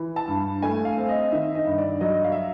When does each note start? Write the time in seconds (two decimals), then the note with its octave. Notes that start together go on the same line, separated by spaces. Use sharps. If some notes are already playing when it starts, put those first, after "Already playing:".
Already playing: E3
0.16 A5
0.28 G2
0.62 A3 G#5
0.85 F5
0.97 C4
1.09 D#5
1.31 D#3 E5
1.55 D#5
1.66 G2
1.78 D5
2.01 F#3 D#5
2.24 F5
2.32 E5